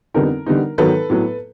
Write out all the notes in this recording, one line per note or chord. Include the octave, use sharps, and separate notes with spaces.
F2 D3 G3 B3 D#4 A#4
D3 G3 B3 D#4
G#2 D#3 F#3 B3 A4 B4
A2 F#3 B3